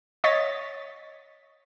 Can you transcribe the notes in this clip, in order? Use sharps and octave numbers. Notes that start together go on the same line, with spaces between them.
C#5 D#5 A6 B6